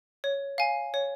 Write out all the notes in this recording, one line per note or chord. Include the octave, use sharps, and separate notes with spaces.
C#5
F5 G#5
C#5